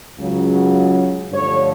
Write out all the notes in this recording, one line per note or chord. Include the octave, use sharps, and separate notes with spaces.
C#2 C#3 F#3
G2 D3 F3 A3 C#5